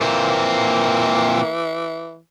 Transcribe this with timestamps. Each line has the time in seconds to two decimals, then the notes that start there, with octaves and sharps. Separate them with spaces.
0.01 A#2 E3 A#3 C4